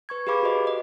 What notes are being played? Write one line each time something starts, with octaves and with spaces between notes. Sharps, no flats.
B4 C#6 G#6
G4 G#4 B4 F5 B5 D6
F#4 A4 C5 D#5
D#5